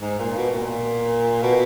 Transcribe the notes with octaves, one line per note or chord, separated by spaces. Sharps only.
G#2
A#2
B2
A#2
B2